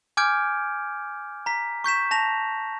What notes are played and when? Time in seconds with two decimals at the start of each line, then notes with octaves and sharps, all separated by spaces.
0.17 G#5 D6 F6 G6 G#6 D7
1.46 A#5 B6
1.84 C#6 G6 B6 E7
2.11 A5 A#6 F7